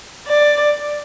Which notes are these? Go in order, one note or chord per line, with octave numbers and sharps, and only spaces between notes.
D5